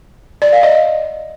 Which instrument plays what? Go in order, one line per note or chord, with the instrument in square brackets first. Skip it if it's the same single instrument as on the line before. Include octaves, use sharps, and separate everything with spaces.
[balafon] D5
F5
D#5